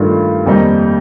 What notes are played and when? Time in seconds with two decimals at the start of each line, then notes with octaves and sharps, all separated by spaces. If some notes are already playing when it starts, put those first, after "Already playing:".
Already playing: G2 D#3 A3 D4 F4
0.46 F2 D#3 G3 A#3 D#4